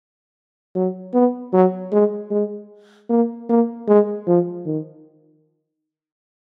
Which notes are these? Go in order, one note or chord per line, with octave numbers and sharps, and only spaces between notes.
F#3
B3
F#3
G#3
G#3
A#3
A#3
G#3
F3
D#3